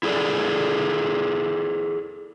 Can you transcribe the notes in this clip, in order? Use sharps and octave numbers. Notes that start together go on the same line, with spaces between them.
E4 G#4 A4 D5